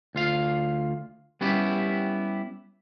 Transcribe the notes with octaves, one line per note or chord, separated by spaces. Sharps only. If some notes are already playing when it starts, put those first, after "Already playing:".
D2 F4 F5
G3 B3 C#4 E4 G4